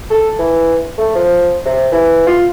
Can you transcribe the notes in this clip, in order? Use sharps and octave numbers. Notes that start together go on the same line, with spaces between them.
A4
E3
A3
F3
C3
E3
F4